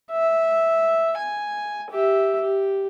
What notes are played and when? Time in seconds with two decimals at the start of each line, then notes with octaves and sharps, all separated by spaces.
0.11 E5
1.18 G#5
1.90 G4 E5
2.41 G4